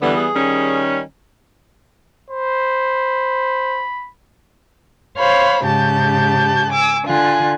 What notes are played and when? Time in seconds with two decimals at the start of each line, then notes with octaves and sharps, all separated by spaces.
0.02 D3 E3 G3 B3
0.17 G#4
0.35 D#3 G3 C#4
2.30 C5 B5
5.18 C5 C#5 F5 B5 C6
5.66 G#2 C#3 G4 A5 G6
6.71 G#5 D6 E6
7.05 D3 F4 G#5 F#6